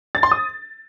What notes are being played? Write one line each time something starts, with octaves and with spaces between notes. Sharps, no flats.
A6
C6
D#6